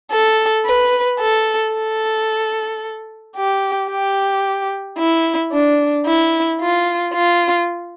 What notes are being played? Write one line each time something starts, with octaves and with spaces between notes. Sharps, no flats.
A4
B4
A4
A4
G4
G4
E4
D4
E4
F4
F4